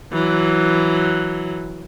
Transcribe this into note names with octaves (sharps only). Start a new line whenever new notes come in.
E3 F#3